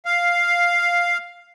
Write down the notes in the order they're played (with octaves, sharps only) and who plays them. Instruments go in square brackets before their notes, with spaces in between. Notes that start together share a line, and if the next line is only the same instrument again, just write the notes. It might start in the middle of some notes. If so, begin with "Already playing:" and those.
[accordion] F5